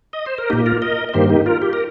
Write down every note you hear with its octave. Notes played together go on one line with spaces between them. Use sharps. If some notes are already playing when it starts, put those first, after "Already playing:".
D#5
C5
A#4
A#2 A#3 D#4 G4
F4 A#4
A#4 D#5
D#5
G2 D#3 A#3 G4 C5
D#4 G4
F4 A#4
G4
A#4